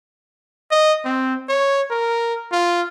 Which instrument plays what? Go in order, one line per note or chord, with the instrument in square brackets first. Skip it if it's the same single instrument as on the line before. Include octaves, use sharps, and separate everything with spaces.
[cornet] D#5
C4
C#5
A#4
F4